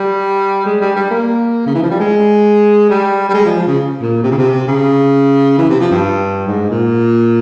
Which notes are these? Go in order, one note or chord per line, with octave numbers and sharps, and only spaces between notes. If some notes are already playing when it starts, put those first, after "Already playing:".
Already playing: G3
G#3
G3
G3
A#3
C#3
E3
F3
G3
G#3
G3
G3
G#3
F3
F3
C#3
A#2
C3
C#3
C3
C#3
E3
C3
F3
G2
G#2
A#2